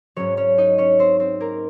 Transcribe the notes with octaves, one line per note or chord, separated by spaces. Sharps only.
G#2 F#3 C#4 C#5
C#4 C#5
D#4 D#5
C#4 C#5
C4 C5
C4 C5
A#3 A#4